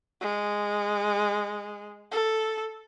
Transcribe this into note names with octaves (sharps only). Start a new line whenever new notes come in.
G#3
A4